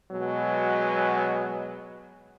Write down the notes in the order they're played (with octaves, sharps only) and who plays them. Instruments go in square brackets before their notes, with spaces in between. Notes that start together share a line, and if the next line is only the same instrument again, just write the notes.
[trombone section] B2 F#3 G#3 B3